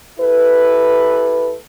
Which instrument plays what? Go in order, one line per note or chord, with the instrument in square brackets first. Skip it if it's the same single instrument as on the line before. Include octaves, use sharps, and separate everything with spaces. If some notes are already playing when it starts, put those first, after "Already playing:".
[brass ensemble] E4 G4 A4 B4